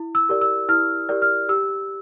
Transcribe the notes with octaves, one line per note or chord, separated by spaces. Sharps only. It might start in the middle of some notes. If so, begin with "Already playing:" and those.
Already playing: E4
E6
G4 A#4 D5
E6
E4 F6
G4 A#4 D5
F6
G4 E6